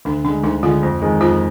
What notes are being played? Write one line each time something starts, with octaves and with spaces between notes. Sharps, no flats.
D2 D4
D3 G#3 D4
D2 D#4
D3 G#3 F4
F2
D#3 G#3
F2 F4